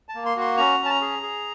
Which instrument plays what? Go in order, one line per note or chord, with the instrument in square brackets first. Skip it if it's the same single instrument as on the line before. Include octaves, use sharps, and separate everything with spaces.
[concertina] A5
A#3
C6
F#4 C6
C#4 A#5
C#4
A5
A#5
G#4
G#4